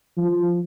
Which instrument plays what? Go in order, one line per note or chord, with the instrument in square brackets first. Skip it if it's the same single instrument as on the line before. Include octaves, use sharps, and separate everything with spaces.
[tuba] F3